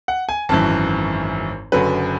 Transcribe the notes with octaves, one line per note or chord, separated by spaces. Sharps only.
F#5
G#5
G#1 F#2 E3 A5
F#1 F#2 D3 F#3 B4